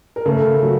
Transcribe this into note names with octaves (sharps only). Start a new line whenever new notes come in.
A#4
C#3 A3 A4
F#3